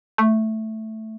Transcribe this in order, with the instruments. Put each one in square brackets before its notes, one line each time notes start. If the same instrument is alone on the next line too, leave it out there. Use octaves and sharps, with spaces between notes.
[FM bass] A3